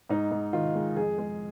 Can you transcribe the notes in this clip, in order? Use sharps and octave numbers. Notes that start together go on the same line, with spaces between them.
G#2 D#4
G#2
D#3 F4
G#3
F2 G#4
G#3